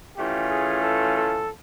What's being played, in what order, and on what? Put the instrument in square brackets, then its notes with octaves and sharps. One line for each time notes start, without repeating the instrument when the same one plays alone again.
[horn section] E3 A3 C#4 F4 G4
G#4
A4
A4